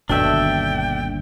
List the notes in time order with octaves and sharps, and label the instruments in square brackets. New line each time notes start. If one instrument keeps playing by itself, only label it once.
[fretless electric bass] G1 D#2 [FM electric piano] B2 D3 A3 [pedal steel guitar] D4 E5 [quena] G5